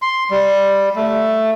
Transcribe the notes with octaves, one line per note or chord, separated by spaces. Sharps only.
C6
G3
A3